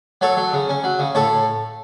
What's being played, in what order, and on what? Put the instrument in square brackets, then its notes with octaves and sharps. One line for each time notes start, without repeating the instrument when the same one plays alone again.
[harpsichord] F#3 A4 C#5
F#3
C#3
C#4
F#3
C#3
A2 A4 C#5